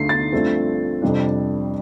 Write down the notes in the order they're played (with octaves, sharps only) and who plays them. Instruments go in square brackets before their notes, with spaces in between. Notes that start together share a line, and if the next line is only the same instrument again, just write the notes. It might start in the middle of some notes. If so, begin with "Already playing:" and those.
Already playing: [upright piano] D2 D3 A3 C7
A6
G2 F3 A3 C4
F2 C3 G3 D4